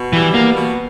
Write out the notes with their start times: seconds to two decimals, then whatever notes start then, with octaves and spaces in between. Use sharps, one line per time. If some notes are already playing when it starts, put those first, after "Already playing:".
Already playing: B2
0.13 E3 G3
0.34 A#3 B3
0.56 B2